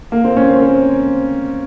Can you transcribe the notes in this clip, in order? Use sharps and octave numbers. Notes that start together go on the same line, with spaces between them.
A#3
C4
C#4
C4
C4